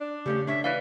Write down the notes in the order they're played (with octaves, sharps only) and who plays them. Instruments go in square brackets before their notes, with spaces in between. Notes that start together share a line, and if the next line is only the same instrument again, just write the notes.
[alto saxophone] D4
[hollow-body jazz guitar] C#3 A3 C#4 [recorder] G4
[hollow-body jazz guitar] D4 C#5 [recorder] E5
[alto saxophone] E3 [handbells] B4 D5 F5 [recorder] E5